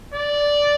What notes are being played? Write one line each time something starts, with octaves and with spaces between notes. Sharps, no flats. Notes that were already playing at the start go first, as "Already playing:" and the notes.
D5